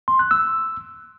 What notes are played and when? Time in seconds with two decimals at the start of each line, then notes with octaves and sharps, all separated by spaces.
0.08 C6
0.19 F#6
0.31 E6